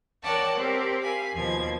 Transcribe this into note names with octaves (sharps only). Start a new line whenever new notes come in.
A#4 C#5 D5 F#5 G5 A5
C4 G4 A#4 D5
F5 G#5 B5
D#2 B2 F3 G#6